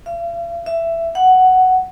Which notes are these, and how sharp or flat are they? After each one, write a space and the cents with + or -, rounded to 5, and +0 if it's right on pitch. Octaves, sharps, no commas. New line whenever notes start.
F5 -45
E5 +15
F#5 +5